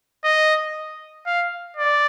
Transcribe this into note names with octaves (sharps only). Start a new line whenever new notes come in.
D#5
F5
D5